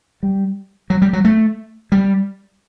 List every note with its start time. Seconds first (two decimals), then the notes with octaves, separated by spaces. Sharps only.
0.23 G3
0.90 F#3
1.02 G3
1.13 F#3
1.25 A3
1.92 G3